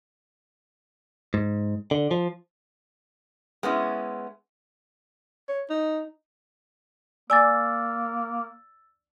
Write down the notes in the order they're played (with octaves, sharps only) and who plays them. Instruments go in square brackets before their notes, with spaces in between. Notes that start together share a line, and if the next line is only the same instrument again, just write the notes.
[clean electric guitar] G#2
D3
F3
[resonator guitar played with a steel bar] G#3 B3 C#4 E4
[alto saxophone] C#5
D#4
[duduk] A#3 [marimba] D5 G#5 D6 [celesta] E6 A6